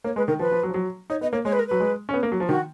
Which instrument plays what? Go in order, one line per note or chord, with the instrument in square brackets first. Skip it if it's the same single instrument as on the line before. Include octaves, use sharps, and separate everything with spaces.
[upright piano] A#3 [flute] C#5
[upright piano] G#3 [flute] B4
[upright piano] D#3 [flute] A#4
[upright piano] F3 [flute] B4
[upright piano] F3
F#3
F3
F#3
[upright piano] D#4 [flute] C#5
[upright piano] B3 [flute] D#5
[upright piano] A#3 [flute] C#5
[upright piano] G#3 [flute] C#5
[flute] B4
A#4
[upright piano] F#3 [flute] B4
[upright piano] G#3
C#4
B3
A#3
F#3
F3
[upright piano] D#3 [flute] F#4